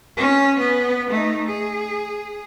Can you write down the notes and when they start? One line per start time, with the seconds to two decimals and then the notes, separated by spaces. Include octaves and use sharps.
0.17 C#4
0.59 B3
1.10 A3 D#4
1.47 G#4